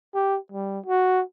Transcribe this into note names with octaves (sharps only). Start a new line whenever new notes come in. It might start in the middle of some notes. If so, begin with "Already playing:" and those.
G4
G3
F#4